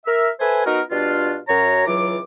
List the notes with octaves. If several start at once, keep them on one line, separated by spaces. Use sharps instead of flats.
A#4 E5
A4 B4 C5 E5 G#5
B3 D#4 F#4 A#4
B2 G3 D4 F4
F#2 C#5 A#5
C#2 E3 F#3 F4 D6